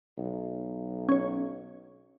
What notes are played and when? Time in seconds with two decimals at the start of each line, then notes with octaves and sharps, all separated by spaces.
0.18 B1
1.09 C#4 C#5